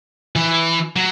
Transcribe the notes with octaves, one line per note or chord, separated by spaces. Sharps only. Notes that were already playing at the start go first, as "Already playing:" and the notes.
E3
F#3